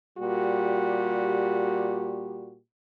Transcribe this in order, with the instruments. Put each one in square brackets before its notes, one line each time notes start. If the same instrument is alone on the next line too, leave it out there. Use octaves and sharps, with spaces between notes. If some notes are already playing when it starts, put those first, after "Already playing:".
[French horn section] A#2 G3 F#4 G4